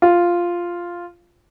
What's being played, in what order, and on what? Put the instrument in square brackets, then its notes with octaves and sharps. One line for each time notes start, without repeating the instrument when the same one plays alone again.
[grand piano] F4